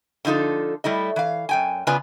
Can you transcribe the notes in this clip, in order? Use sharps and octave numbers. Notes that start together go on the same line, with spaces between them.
D3 F3 D#4 F4 A4
G3 A3 E4 D#5
E3 F5
F#2 G5 G#5
C#3 B3 F4 B4 D5 G#5